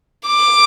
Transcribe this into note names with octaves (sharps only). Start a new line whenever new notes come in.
D6